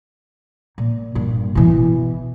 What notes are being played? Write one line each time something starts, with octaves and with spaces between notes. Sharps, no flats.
A#2
G2 A#2
B2 E3